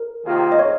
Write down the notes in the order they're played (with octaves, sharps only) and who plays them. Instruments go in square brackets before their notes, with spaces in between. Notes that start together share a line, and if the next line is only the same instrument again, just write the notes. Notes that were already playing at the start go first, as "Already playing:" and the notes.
Already playing: [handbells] A#4
[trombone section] C3 D#3 A#3 F4 G#4
[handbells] D#5
C#5